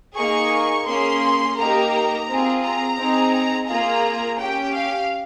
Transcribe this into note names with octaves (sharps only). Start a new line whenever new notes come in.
A#3 D#4 G#4 C#6
A#3 C#4 G#4 C6
A#3 D#4 G4 A#5
C4 F4 G#4
A#5
C4 D#4 G#4
A#3 F4 G#4 A#5
C#4 G4 G5
F5